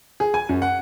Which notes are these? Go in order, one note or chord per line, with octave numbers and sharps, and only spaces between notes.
G#4
G#5
F#2
F#5